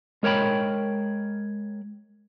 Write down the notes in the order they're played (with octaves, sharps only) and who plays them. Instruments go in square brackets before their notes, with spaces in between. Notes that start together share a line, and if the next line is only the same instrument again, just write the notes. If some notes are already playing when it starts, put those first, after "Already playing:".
[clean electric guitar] G#3 A#4 C#5 G5 B5